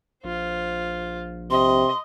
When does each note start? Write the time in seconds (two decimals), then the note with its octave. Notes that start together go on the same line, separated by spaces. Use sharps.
0.24 A#1 F4 C5
1.50 C3 D#5 C6